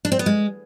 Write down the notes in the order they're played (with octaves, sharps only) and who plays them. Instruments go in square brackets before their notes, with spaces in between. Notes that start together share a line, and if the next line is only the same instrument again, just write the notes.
[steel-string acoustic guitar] D4
C4
B3
G#3